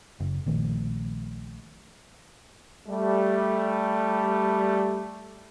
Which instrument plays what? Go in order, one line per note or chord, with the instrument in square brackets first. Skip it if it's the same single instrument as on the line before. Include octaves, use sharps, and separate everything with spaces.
[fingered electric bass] F#1
A#1 D#3 A3
[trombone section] G3 A3